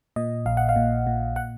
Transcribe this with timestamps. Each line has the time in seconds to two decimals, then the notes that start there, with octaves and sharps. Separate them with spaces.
0.16 A#2 D#5
0.46 A#1 F5
0.57 F#5
0.69 F5
0.76 A#2
1.07 A#2
1.36 F#5